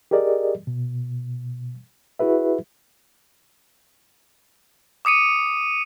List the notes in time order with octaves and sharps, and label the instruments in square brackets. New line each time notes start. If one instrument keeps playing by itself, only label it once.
[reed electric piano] G4 G#4 A#4 D5 D#5
B2
E4 F#4 G#4 B4 E5
[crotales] D6 D#6 C#7 D#7